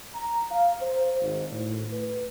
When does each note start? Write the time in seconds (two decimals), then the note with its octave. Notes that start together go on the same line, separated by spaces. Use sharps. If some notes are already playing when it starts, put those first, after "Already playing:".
0.15 A#5
0.51 F5
0.81 C5
1.21 G#1
1.52 A2
1.92 B4